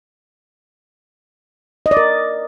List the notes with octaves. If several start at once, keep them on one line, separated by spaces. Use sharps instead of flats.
D#5
D5
A#4